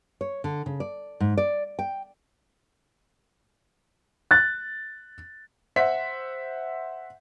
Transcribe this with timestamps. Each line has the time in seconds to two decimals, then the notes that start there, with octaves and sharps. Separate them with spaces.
0.21 C#5
0.44 D3
0.66 C#3
0.80 D5
1.20 G#2
1.37 D5
1.79 G5
4.31 F#6 A6
5.76 C5 E5 F#5 B6